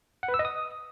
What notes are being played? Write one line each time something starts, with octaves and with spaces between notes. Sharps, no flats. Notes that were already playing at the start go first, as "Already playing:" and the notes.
F#5
B4
E6
D#5
D#6